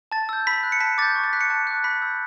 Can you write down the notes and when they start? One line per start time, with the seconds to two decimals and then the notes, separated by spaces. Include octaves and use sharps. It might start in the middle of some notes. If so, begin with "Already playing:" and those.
0.12 A5 A6
0.29 E6 G6
0.47 B5 B6
0.63 F#6
0.72 C#7
0.80 A5 B6
0.98 D6 G6 A6
1.15 C#6
1.24 A6
1.33 F#6 B6
1.41 C#7
1.50 A5
1.67 D6 F#6
1.84 B5 B6
2.02 E6 G6